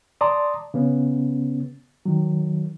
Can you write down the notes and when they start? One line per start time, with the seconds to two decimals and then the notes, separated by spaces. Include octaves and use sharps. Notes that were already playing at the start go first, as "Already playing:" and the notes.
0.21 D5 A5 A#5 C6 D6 D#6
0.74 C#3 B3 C#4
2.06 D#3 F#3